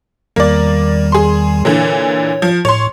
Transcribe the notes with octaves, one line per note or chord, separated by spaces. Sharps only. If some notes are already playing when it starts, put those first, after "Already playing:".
E2 D#3 G3 A#3 D5
G#4 C6
A#2 D3 E3 C#5
F3
A2 C#5 C6